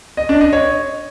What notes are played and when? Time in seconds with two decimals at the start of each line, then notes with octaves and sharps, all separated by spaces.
0.17 D#5
0.29 D4
0.41 D#5
0.53 C#5